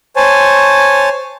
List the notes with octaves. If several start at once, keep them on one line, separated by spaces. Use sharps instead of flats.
C5 C#5 G#5 A5